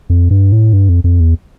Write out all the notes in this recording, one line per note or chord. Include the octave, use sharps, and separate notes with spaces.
F2
G2
A2
G2
F2
F2
E2